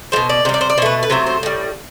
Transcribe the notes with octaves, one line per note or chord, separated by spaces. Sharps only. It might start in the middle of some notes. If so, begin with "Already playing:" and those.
B2 G3 C5
D5
C3 G3 C5
D5
C5
D5
B2 A3 B4 C5
B4
C3 F#3 A3 C5
C5
A2 G3